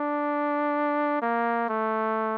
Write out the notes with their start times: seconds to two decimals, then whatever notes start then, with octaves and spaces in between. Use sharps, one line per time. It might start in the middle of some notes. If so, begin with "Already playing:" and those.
Already playing: D4
1.22 A#3
1.69 A3